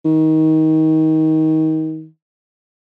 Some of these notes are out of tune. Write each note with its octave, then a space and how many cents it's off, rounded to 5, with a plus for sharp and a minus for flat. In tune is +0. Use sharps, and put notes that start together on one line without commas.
D#3 +25